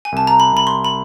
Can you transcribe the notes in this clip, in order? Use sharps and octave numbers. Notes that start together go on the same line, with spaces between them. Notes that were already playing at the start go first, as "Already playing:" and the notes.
G#5
C2 A5
A#5
B5
C2 B5
C6
B5